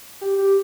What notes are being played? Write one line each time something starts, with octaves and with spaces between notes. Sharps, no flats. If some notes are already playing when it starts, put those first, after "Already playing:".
G4
G4